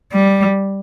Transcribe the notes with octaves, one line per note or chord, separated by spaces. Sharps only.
G3